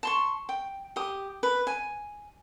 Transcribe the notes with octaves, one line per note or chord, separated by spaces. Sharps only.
A5 C6 C#6
G5
G4 D#6
B4
G#5